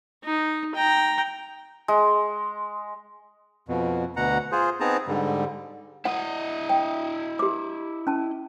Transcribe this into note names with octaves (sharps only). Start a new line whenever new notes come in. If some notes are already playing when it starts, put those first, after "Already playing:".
D#4
G5 A#5
G#3
F2 B2
D2 B2 F#5 A#5
F4 G#4 C5
B3 C4 D#4 G#4 A5 A#5
G#2 D3 G3
E4 D#5 F#5
G5
G4 D6
C#4 A5